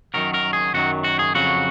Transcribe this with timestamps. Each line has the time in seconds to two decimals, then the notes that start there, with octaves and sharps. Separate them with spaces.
0.14 F#2 D#3 F#3 A#4
0.34 A#4
0.53 G#4
0.74 F#2 D#3 F#3 F#4
1.04 F#4
1.19 G#4
1.35 F2 C#3 F#3 F#4